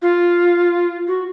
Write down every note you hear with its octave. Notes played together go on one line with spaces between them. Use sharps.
F4
F#4